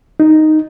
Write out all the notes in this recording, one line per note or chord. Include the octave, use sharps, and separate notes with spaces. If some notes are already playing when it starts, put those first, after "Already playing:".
D#4